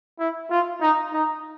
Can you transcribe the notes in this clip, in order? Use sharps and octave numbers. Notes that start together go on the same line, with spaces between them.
E4
F4
D#4
D#4